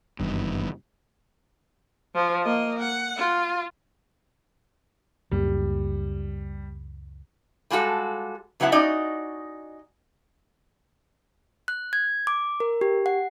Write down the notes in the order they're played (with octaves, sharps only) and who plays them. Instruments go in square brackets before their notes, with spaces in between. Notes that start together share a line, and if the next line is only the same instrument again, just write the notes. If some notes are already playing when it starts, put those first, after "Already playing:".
[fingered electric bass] F#1 G2 [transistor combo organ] D#3 E3 B3
[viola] F3
A#3 D#5
F#5
F4
[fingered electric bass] C#2 F#2 A#3 [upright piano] G3
[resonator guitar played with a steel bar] G3 G#3 F4 F#4 A4
C#3 F#3 B3 E4 F#5 A5
C#4 D#4 F#4 D5 D#5
[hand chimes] F#6
G#6
D6
A#4
G4
F#5